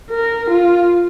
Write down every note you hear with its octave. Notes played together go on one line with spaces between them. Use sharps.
A#4
F4